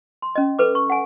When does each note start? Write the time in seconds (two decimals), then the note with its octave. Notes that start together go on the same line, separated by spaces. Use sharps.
0.22 C6
0.36 C#4 D#5
0.59 A4 B4 D6
0.75 C#6
0.90 F#5 G#5